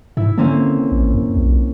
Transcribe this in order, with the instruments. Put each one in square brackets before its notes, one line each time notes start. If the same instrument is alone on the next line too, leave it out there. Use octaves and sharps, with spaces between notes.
[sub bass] G#2 [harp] E4
[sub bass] D3 [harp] A#3 C4 C#4
[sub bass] A1
F2
B1